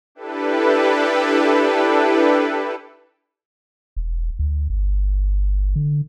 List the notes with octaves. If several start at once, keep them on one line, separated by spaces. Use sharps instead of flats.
D4 E4 G4 A4 B4
E1
D2
G1
D3